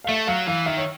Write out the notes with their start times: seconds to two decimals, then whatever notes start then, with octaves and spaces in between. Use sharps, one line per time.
0.04 F5
0.09 A3 E5
0.27 F#3 F5
0.47 E3 F5
0.66 D#3 E5
0.77 C#5